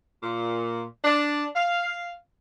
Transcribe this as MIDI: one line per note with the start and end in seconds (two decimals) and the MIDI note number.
0.23 0.84 46
1.04 1.45 62
1.55 2.12 77